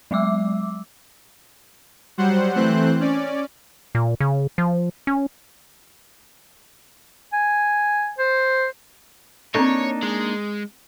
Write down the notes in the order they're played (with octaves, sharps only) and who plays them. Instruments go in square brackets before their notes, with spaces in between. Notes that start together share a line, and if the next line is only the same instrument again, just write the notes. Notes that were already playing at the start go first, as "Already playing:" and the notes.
[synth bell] F#3 G#3 E5 D6 E6
[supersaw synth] F#3 G3 C5 F#5
E3 A3 C4 C5 F#6
C#4 D5
[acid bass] A#2
C#3
F3
C#4
[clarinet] G#5
C5
[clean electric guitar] A#3 D4 D#4 [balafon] C4 A4 [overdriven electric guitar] C#5
[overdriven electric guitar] G#3